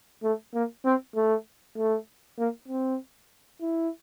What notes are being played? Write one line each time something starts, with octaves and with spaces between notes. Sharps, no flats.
A3
A#3
C4
A3
A3
A#3
C4
E4